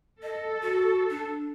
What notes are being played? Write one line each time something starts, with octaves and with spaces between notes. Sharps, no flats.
A4 D#5
F#4
D4